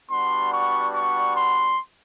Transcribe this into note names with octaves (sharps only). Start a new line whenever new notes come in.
G3 B3 D4 F#4 C6
C#6
C#6
C6